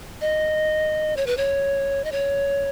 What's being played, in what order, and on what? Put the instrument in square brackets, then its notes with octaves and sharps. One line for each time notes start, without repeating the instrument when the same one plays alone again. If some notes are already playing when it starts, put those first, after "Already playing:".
[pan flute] D#5
C#5
B4
C#5
D#5
C#5